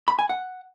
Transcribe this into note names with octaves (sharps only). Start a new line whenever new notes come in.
B5
G#5
F#5